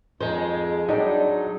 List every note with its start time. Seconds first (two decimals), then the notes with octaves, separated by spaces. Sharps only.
0.20 F2 G#3 D#4 G#4 C5
0.89 F#3 G3 D4 D#4